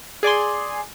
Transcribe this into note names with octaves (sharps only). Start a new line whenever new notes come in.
G#4 D5 G#5 C6